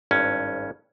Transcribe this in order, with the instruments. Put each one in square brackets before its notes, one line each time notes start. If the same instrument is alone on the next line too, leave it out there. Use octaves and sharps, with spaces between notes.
[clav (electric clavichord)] G#1 G2 C#4